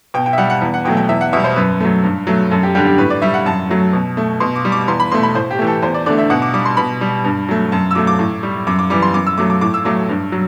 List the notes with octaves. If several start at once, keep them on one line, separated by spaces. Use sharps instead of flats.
B2 G5
G5
E5
G3 F#5
F#5
E2
F#5
B2 F#3 A3 G5
G5
E2 E5
F#5
B2 G3 E5
C5
F#2 B4
F#3 A3
G2
F#3 A3
F#2 A4
G4
D3 G3 G4
G4
A2 B4
D5
G3 E5
F#5
F#2 A5
F#3 A3
B2
A3
B2 C6
D6
G3
D6
E2 C6
B5
B2 A3 C6
B5
A2 C5
G4
E3 A3
A4
E2 C5
D5
D3 A3 D5
E5
B2 F#5
D6
G3 D6
C6
B2 B5
G3
G2
F#3 A3
F#2 A5
E6
F#3 A3 D6
D6
A2
G3
F#2 D6
D6
E3 G3 D6
C6
F#2 D6
E6
F#3 A3 D6
D6
A2 D6
E6
F#3 A3 D6
G2
F#3